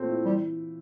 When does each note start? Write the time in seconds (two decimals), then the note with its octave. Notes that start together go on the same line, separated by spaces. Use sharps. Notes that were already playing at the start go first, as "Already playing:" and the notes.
Already playing: A#2 A3 C4
0.09 E4
0.25 E3 G3